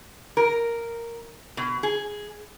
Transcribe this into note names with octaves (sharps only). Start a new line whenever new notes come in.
A#4
B2
G#4